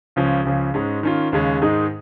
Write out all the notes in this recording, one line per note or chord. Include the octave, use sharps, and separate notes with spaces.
C#2 C#3 F3 C#4
C#2 C#3 F3 C#4
G#2 G#3 C#4
D#3 C#4 F4
D#2 C#3 G#3 C#4
G#2 D#3 G#3 D#4 G#4